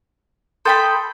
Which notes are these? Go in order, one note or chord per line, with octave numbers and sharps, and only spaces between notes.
A4 G5 B5 C6 D#6 G6